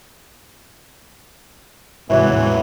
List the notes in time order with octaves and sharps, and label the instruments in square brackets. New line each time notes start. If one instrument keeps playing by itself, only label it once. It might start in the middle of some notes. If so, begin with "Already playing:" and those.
[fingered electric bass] G#2 C3 G#3 [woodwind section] E3 F#3
[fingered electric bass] E2 A2 G#3